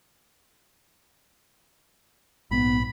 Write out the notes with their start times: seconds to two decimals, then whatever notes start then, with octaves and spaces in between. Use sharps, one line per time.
2.51 A#1 G#2 B3 B5